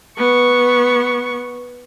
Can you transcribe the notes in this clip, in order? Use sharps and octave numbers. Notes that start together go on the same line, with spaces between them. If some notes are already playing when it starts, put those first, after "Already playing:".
B3 C#6